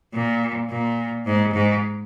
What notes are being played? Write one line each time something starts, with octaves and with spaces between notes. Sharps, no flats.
A#2
A#2
G#2
G#2